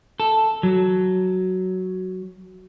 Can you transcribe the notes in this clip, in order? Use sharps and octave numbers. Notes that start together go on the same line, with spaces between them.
A4
F#3